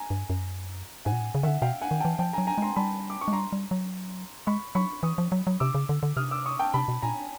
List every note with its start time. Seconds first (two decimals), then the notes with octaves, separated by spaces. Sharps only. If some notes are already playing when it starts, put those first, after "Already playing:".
Already playing: G#5 A#5
0.10 G2
0.30 F#2
1.05 G#2 F#5 G#5
1.12 A#2
1.20 A2
1.35 C#3
1.43 D3 D#3 E5 F#5
1.62 B2 F5 G5
1.81 F#5 G#5
1.91 D#3
2.00 E3 G5 A5
2.19 F3 G5 A5
2.33 F#3 G#5 A#5
2.47 G#5 A#5
2.58 G#3 A#5 C6
2.76 G3 A5 B5
3.10 D6
3.21 C#6
3.28 G#3
3.33 G3 A#5 C6
3.53 G3
3.71 F#3
4.47 G#3 B5 C#6
4.75 F#3 B5 C#6
5.03 E3 C#6 D#6
5.18 F3
5.32 F#3
5.47 F#3
5.60 C3 D6 E6
5.74 C#3
5.89 D3
6.03 D3
6.17 C3 D#6 F6
6.31 D6 E6
6.46 C#6 D#6
6.59 G5 A5
6.74 C3 A5 B5
6.88 B2
7.02 A#2 G#5 A#5